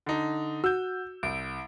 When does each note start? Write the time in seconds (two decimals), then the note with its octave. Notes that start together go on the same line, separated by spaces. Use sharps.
0.06 D3 D#4
0.64 F#4 E6 G6
1.23 C2 D7